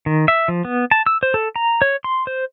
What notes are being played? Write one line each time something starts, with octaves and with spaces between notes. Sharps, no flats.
D#3
E5
F3
B3
A5
E6
C5
A4
A#5
C#5
C6
C5